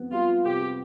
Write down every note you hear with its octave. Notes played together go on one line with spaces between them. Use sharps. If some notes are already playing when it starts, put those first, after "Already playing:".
Already playing: F2 B3
G3 F4
C3 G4